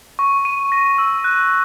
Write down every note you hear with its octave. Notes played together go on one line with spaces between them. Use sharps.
C#6
D#7
A#6
E6
F#6